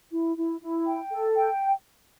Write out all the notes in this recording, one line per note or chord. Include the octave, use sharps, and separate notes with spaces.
E4
E4
E4
G5
A4
G5